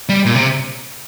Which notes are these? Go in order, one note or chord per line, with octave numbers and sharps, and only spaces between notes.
G3
A#2
C3